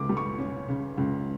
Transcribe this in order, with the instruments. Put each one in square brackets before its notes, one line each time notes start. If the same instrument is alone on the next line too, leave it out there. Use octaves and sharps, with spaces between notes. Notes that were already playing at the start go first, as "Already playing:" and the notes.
Already playing: [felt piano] C#2 C#3 D6
G3
C#6
C#4
C#3
C#2